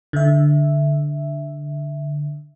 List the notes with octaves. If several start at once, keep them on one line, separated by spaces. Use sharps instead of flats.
D3 E5